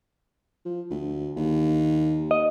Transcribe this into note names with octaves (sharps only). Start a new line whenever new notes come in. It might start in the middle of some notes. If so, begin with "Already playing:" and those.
F3
D2
D#2
D#5